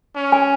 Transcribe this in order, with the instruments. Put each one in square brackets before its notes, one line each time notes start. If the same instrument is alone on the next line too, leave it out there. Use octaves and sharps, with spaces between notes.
[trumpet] C#4
[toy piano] G#5